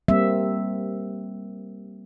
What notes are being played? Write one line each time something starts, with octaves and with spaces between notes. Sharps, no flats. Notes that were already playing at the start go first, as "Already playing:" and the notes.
G3 A#3 C4 E5